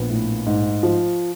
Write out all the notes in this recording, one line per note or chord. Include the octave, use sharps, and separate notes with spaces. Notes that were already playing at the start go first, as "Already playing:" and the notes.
Already playing: A#1 B3 B4
A2
G#2
F3